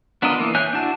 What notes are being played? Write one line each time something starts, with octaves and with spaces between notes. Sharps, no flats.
B3 D4 F4 A#4 D#5
E3 A#3
C#5 E5 G#5 F#6 G6
D4 E4 F#4 A5